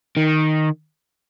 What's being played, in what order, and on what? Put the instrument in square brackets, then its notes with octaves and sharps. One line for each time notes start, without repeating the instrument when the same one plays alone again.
[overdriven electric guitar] D#3